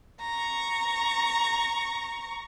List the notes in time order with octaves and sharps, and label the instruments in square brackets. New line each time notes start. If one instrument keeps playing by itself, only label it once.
[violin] A#5 C#6